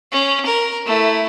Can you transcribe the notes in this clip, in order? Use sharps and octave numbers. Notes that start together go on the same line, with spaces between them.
C#4
A#4
A3 E4